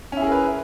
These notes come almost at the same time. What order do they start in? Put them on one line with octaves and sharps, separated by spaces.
C#4 E4 G#4 A#4 B4